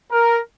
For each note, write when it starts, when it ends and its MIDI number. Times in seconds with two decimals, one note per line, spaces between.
0.11 0.38 70